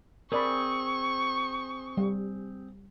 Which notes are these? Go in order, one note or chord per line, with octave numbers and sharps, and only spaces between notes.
C4 G#4 A#4 D5 B5 C#6
G3